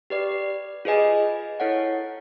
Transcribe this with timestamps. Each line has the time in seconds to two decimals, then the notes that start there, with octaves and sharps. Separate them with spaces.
0.10 G4 B4 D5
0.85 F4 G#4 B4 D#5 G#5
1.60 E4 A4 C#5 F#5